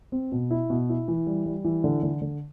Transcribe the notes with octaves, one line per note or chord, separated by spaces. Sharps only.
C4
B2
E4
B2
E4
E3
G3
G3
E3
D3
D3
D3